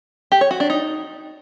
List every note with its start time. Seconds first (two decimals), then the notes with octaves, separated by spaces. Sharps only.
0.32 G4
0.41 C#5
0.51 F#4
0.60 D4
0.70 D#4